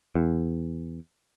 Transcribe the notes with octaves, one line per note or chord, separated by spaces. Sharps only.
E2